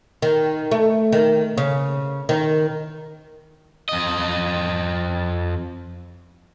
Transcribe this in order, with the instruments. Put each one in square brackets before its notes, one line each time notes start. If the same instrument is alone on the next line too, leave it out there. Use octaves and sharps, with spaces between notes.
[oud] D#3
A3
D#3
C#3
D#3
[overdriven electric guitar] F2 D#5